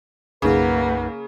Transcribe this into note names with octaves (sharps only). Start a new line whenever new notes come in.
B1 F#2 C#3 A#3 D#4 B4 F#5